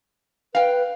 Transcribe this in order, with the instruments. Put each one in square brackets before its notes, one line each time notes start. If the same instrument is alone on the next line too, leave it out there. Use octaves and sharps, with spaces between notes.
[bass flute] B4 [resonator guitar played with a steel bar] F5 G5